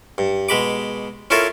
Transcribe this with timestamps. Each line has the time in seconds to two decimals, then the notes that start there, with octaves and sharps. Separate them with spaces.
0.18 G2
0.49 B2 G#3 B5 D6
1.30 C#4 E4 F4 A4 A#4 C#5